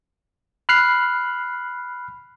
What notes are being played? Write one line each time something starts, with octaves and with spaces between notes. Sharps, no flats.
B5 F6 F#6 C7